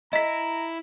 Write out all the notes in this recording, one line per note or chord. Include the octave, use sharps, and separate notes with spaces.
E4 D#5 A#5 B6